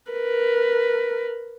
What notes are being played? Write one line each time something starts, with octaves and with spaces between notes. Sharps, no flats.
A#4 B4